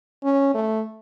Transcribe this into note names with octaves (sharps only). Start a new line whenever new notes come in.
C#4
A3